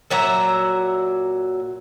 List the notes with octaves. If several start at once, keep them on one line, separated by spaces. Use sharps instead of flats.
A#2 F#3 E5 A#5